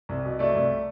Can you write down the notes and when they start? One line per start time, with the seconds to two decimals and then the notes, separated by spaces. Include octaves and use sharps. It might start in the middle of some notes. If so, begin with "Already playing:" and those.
0.09 C2
0.25 B2
0.39 A3 D5
0.55 C2